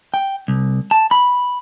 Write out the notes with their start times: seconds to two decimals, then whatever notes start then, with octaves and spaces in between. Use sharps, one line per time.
0.14 G5
0.48 C2
0.91 A5
1.11 B5